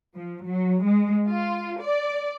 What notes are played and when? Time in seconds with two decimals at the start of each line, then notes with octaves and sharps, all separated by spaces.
0.15 F3
0.45 F#3
0.83 G#3
1.28 F4
1.81 D5